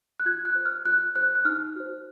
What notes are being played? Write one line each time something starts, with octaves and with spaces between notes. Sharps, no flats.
F#6
F4 G#6
F#6
C5
F6
F4 F#6
C5 F#6
F#6
D#4 F6
F#4 C5